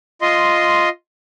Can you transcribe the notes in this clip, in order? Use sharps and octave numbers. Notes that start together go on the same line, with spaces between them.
F4 D#5 C6